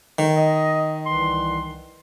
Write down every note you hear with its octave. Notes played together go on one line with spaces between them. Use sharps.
D#3
D#5
C2 E3 C6